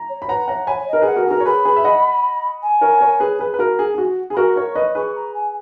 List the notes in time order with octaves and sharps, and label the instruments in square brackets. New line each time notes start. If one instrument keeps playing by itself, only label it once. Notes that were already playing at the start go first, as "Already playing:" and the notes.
Already playing: [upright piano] A#5
[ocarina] C#5
[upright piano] B5
[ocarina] B4 [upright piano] F#5 A#5
[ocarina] C#5 [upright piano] F#5 A#5
[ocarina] C#5 [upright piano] G#5 B5
[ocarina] C#5
D#5
[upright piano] A#4
[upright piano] G#4 B4 [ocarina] F#5
[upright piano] F#4 A#4
[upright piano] G#4 [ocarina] A#5
[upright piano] F#4 A#4
C#5
[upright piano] G#4 B4 [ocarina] B5
[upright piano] G#4 B4
E5
D#5 F#5
[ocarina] G#5
[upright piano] A#4 C#5
A#4 C#5
G#4 B4
G#4 B4
B4
F#4 A#4
G#4
G#4
F#4
G#4
[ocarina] B5
[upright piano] F#4 A#4 [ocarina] C#6
[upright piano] A#4 C#5
B4 D#5
[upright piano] G#4 B4 [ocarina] C#6
[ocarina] A#5
G#5